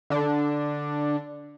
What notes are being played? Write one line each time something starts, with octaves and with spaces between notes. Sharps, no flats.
D3 D4